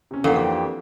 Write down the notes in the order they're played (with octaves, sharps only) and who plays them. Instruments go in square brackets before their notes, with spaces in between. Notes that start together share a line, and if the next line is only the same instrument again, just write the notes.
[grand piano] C3 C#4
[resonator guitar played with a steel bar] F2 [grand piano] E3 A#3 D4 [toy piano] A4 F#5
[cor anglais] G4 [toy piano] F5